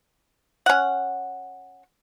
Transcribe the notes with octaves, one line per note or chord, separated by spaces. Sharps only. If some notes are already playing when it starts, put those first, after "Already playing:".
C#4 F#5